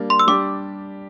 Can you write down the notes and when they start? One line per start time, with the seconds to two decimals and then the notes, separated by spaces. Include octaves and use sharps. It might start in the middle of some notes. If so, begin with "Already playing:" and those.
Already playing: G3 A#3 D4
0.10 C6
0.19 E6
0.27 G3 D4 G4 D6